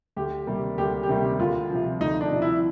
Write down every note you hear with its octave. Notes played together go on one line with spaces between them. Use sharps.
D2 G4
C3 D#3 G3 A#3
D2 G4
G4
C3 D#3 G3 A#3
D2 F4
C3 F3
D2 D#4
D4
C3 F3
E4